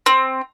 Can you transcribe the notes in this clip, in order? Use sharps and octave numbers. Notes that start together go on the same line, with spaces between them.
C4